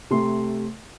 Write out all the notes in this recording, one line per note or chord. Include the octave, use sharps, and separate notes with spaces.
C3 A3 C6